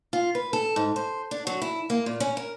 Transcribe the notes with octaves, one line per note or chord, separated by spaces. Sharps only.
F4
B4
A4
G#2
C5
D4
F#3
E4
A#3
A#2
C#4
A#4